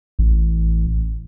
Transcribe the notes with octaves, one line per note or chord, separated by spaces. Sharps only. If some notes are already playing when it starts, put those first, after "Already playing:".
A1